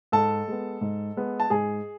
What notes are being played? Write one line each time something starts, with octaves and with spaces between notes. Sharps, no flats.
G#2 A4 A5
G#3 B3
G#2
G#3 B3
A5
G#2 G#4 G#5